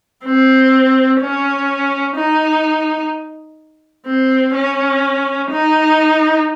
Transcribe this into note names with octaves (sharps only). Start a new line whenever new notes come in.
C4
C#4
D#4
C4
C#4
D#4